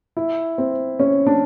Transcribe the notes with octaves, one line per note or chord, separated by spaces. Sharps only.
E4
C4
C#4
D4